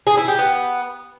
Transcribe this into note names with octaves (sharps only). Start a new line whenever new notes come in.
G#4
E4
G4
B3